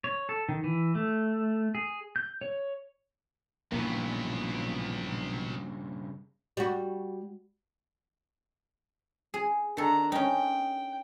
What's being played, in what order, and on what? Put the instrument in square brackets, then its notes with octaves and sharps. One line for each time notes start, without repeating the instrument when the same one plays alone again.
[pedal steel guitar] C#5
A4
D#3
E3
A3
G#4
G6
C#5
[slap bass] A#1 E3 [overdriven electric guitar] G2 C#3 [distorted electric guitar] F#3 B3 [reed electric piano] A#3
[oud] G3 F#4
[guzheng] G#4
[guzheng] D#3 A4 [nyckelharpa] D4 A#5
[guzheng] C#4 D#4 [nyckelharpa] G5